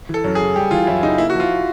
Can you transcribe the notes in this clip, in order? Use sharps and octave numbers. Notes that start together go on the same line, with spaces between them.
E3 A4
F#2
G#4
C#3
G3 G4
E3 F4
F#2 E4
C#3 D#4
A#3 E4
F3 F#4
F4